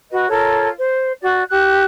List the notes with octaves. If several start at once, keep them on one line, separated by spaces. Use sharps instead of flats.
F#4 B4 D#5
F4 A4 A#4 C#5
C5
F#4 D5
G4 F#6